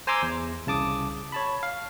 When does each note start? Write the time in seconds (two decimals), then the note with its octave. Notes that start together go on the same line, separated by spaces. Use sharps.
0.07 C5 G#5 A#5 C6 D6 E6
0.22 E2
0.66 C2 C#3 A5 D6 D#6
1.32 C#5 A5 B5
1.63 F5